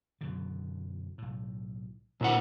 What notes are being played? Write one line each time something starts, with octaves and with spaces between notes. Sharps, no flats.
F#2 B2 D3
B1 A2
D2 A#2 E4 F#5